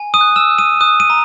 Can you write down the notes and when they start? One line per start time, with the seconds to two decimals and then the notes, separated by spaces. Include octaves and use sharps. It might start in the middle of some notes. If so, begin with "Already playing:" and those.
Already playing: G#5
0.14 D#6 D#7
0.21 F#6
0.36 E6 E7
0.51 F#6
0.58 D#6 D#7
0.80 D#6 F#6 D#7
1.00 D#7
1.10 A#5